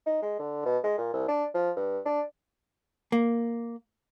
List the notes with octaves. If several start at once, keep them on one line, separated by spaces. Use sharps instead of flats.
D#4
G#3
D3
B2
G#3
A#2
C2
D4
F3
G2
D4
A#3